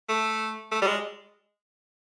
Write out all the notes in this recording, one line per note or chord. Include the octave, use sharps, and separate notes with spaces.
A3
A3
G3
G#3